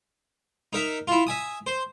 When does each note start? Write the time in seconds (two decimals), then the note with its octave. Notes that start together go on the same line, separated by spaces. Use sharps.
0.73 D#4 A#4 E5
1.08 E4 F4
1.27 E5 G#5 D#6
1.67 C5